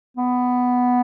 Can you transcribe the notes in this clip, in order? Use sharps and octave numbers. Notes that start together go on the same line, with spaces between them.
B3